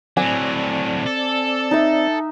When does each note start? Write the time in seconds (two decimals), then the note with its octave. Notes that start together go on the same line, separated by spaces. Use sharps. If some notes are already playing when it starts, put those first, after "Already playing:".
0.17 A2 F#3 C4 D5 G#5
1.06 A4
1.71 D#4 E5